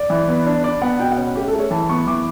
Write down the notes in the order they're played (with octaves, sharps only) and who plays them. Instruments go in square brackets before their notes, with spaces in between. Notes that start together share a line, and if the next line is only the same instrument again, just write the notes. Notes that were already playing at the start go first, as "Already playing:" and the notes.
Already playing: [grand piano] D5
E3
B3
D4
D4 D5
B3 F#5
B2 G5
F#5
C#4
A3 G4
A4
A3
C#5
E3 A5
B3 C#6
E3 D6